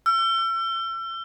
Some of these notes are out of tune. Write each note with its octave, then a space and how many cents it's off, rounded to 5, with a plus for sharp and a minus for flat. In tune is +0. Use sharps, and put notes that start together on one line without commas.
E6 +40